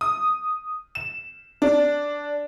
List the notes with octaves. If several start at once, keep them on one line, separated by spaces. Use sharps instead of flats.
D#6
E7
D4